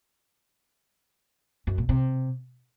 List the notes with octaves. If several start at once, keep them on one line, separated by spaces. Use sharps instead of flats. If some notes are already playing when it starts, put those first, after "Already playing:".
F#2
A#2
C3